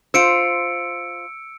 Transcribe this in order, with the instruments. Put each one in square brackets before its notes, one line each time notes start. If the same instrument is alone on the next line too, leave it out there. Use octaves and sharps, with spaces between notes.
[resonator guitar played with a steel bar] F4 C5 [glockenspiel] E6 C#7 D7